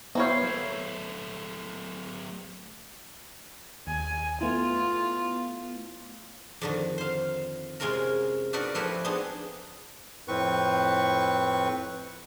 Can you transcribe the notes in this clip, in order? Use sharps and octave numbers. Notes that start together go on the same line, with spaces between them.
A#3 B3 E4 C5 C#5 F5
F#3 A3
D#2 G#5
A3 B3 E4 F4
F2 D3 D#3
C5 F5
C3 G#3 C#4 F4 A#4 A#5
D4 D#4 F#4 A#4 B4 D5
F3 A3 E4 F#4 G4 B4
B3 C4 D4 D#4 G#4 F#5
F2 A2 C4 B4 C#6